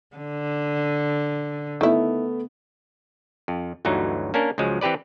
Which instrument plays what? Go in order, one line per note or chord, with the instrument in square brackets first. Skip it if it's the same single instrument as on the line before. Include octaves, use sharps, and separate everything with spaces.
[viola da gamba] D3
[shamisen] D#3 E4 [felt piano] A3 B3
[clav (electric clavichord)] F2
G1 D2 E3 F#3 D#4
A#3 C#4 D4 A#4
C#2 F3 F#3 G#3
E3 C4 G4 B4 D5